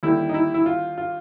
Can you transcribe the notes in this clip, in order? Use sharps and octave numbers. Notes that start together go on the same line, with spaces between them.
D#2 D3 G3 E4
D#4
E4
E4
F4
F4